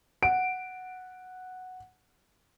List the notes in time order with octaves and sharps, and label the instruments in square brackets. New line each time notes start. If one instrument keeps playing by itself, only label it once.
[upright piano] F#5 D7